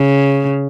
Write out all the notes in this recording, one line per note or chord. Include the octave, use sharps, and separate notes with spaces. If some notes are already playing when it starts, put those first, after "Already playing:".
Already playing: C#3